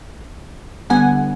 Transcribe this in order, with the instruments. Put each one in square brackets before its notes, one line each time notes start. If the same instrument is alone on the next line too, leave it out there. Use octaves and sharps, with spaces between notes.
[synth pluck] D3 G3 B3 F#5 G#5